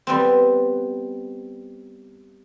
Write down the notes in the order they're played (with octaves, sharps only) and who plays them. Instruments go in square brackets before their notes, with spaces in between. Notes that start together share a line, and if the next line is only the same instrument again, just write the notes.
[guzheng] G3 B3 C4